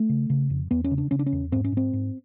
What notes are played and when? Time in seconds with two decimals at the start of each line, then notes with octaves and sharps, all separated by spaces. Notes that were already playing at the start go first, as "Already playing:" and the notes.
Already playing: A3
0.09 C#3
0.30 C#3
0.50 F2
0.71 E2 B3
0.84 C#4
0.91 C#3
0.98 D4
1.11 C#3 C#4
1.19 D4
1.26 C#4
1.32 E2
1.52 G#2 C4
1.64 C#4
1.72 G#2 C4
1.93 G#2